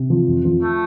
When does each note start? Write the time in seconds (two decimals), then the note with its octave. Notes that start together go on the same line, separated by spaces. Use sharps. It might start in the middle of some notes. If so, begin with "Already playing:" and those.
Already playing: C3
0.10 F3
0.28 F2
0.45 F3
0.62 A3